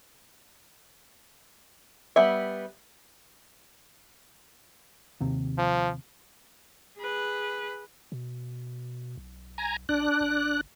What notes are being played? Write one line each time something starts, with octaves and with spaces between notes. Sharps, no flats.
G3 B3 E5
D#2 C3
F3
G#4 B4
B2
B1
G#5 A#5
A#1 D4 F#6
G1